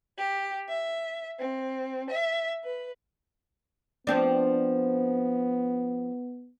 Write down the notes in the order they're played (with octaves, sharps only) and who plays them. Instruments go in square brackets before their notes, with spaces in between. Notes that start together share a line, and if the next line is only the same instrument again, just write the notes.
[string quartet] G4
E5
C4
E5
B4
[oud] F3 C4 D4 [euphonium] B3